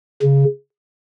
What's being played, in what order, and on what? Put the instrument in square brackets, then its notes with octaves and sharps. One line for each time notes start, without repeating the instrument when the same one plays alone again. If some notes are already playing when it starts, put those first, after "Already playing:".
[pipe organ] C#3